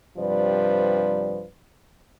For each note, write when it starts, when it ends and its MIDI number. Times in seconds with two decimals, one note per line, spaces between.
0.18 1.44 43
0.18 1.44 48
0.18 1.44 53
0.18 1.44 55
0.18 1.44 71
0.18 1.44 74